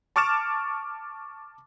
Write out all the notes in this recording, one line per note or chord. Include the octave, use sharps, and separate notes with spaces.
A5 C#6 D6 F6 A6 E7